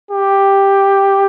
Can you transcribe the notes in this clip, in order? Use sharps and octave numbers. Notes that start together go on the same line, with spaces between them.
G4